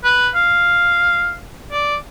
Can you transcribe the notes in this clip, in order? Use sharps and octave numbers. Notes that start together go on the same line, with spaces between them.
B4
F5
D5